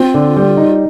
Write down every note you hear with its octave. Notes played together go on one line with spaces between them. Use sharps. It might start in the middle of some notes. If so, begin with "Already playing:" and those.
Already playing: C4 F4
D3
G3
D#4